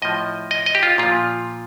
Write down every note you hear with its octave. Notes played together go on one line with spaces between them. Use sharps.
A2 F3 D#5
D#5
D#5
G4
F4
A#2 F3 F4